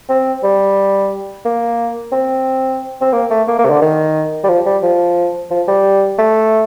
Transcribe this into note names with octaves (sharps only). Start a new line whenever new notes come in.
C4
G3
A#3
C4
C4
A#3
A3
A#3
A#3
C3
D3
D#3
G3
F3
G3
F3
F3
G3
A3